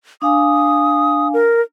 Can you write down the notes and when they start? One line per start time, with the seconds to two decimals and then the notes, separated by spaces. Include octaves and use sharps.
0.22 D4 F5 G#5 D#6
1.34 A#4